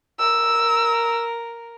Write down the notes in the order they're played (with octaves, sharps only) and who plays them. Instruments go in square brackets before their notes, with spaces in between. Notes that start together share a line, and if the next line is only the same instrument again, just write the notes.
[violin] A#4 [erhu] E6